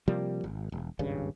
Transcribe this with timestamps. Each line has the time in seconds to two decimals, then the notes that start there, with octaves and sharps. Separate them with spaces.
0.08 C3 F3 G3 A#3
0.44 G#1
0.72 E1
0.99 D#1 G#1 G2 C#3